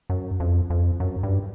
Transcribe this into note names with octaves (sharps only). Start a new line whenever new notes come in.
F#2
F2
F2
F#2
G2